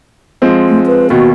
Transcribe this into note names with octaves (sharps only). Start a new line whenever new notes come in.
F3 G#3 C4
A3
B4
D#2 B2 F#4